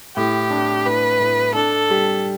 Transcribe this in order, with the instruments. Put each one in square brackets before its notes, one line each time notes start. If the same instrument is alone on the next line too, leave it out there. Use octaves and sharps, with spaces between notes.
[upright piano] A2 [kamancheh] G4
[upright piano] D4
[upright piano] A2 [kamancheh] B4
[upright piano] A2
[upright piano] D4 [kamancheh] A4
[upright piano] G3